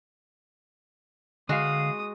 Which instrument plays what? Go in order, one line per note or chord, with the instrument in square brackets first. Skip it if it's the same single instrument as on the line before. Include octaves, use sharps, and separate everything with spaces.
[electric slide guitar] D3 F5 [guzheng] G#3 F#4 [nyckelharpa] D#6